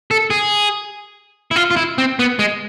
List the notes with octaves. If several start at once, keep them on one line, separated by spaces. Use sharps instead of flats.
A4
G#4
E4
F4
F4
E4
C4
B3
G#3